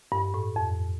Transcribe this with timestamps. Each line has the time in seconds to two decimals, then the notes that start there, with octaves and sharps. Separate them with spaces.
0.12 G2
0.34 A2
0.56 F2